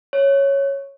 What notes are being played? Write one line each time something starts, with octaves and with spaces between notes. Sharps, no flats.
C#5